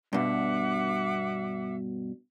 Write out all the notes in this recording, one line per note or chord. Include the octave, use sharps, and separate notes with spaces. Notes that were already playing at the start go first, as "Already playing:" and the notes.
G2 B2 E5 F#5 D6